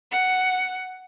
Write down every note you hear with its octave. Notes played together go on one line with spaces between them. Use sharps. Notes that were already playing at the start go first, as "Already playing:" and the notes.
F#5